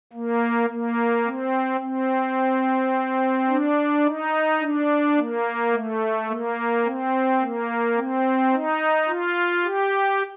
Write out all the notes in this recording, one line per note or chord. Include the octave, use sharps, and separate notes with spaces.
A#3
A#3
C4
C4
D4
D#4
D4
A#3
A3
A#3
C4
A#3
C4
D#4
F4
G4